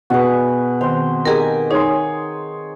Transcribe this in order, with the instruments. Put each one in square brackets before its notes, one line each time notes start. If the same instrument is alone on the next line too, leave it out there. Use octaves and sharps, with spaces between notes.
[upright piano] B2 [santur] F#4 G#4 B4
[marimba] D#3 [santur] C4 C5
[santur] D#4 G4 G#5 [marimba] G#4 A#4
[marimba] D#4 [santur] G#4 [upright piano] C#5 C6